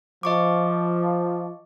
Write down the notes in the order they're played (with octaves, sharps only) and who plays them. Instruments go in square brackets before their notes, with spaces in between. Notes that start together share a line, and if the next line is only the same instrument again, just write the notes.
[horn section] F3 [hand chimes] D#5 C#6 D6